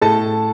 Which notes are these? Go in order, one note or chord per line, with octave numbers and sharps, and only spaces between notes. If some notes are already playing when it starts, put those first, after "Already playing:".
A2 A4 A5